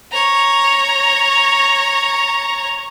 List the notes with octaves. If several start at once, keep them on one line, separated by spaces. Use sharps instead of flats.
C#5 A#5